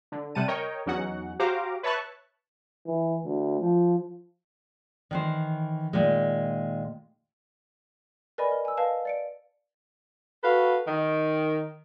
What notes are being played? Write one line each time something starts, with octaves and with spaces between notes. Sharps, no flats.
D3
C3 G3 F#5 A5 D#7
A#4 C#5 D#5 G5
E2 F#3 C#4 D#4 F#4 F#5
F#4 G4 C5 F5 A#5 D6
B4 C#5 E5 A5 C#6 F#6
E3
D2
F3
D#3 E3 C5
A#2 D#3 G#3
A#4 B4 D5 D#5 G#5 B5
A#4
G#5 E6
B4 D#5 F5 A5
D5 C#7 D7
F#4 A4 B4 F5
D#3